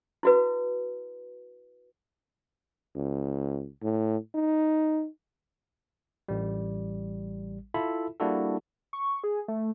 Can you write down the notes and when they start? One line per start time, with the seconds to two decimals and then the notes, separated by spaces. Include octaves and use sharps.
0.23 E4 F#4 B4
2.96 C#2
3.83 A2
4.34 D#4
6.28 A1 G3
7.74 E4 F4 A4 E5 B5
8.20 G3 A#3 D4 E4 F#4 A4
8.93 C#6
9.24 G#4
9.48 A3